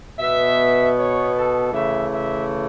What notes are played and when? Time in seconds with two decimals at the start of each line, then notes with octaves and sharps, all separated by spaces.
0.20 B2 B3 E5
0.96 C#5
1.34 A4
1.71 C#3 E3 A3 E5
2.09 E5